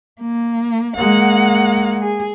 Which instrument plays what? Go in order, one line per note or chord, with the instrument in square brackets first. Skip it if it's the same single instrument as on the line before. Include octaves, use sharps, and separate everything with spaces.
[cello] A#3
[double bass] G#3 A#3 [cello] F#5
[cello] G#4